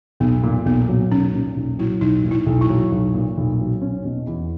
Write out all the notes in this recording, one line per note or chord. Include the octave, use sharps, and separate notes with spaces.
B1 B3
A#2
B1 B3
F#3
B1 C#4
A#2
B1
F#3 E4
B1 D#4
A#2
E4
B1
E4
F#3
B1
A#2
B1
F#3
C#4
B2
E2